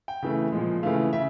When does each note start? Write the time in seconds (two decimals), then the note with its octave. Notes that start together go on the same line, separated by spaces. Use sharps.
0.08 G5
0.22 C#3 E3 A3
0.52 A#2 F3 G#3
0.83 C#3 E3 A3 F5
1.13 C#3 E5